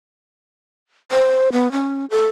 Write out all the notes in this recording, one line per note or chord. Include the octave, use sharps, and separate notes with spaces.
C5
B3
C#4
A4